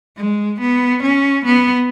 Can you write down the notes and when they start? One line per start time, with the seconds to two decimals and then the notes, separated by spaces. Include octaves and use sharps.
0.17 G#3
0.60 B3
1.03 C#4
1.46 B3